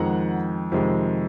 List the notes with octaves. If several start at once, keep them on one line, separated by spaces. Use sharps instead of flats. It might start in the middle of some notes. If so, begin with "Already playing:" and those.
Already playing: F2 D#3 G#3 F#5 A#5
F2 C3 D#3 G#3